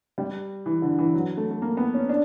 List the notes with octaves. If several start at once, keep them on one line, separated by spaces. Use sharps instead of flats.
G3
E3
D3
E3
F#3
A3
A3
A#3
B3
C#4
D4